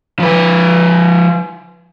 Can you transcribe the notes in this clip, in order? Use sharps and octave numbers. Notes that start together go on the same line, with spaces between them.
F3 B4